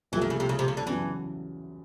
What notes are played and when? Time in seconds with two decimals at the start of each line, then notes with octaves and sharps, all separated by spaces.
0.12 C2 A#2 E3 F3 A3
0.22 D#3
0.30 C#3
0.40 C3
0.49 C#3
0.59 C3
0.68 C#3
0.77 D3
0.86 E2 C#3 E3 F#3